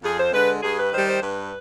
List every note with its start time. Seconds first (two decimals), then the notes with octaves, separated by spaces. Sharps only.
0.03 F2 G#4
0.18 C5
0.33 D3 G#3 B4
0.62 G2 G#4
0.78 B4
0.93 D#3 G3 C5
1.07 C5
1.22 G2 B4